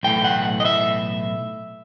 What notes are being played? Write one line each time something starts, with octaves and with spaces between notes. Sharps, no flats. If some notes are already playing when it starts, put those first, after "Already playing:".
B1 A2 E3 A3 G5
F#5
D#5
E5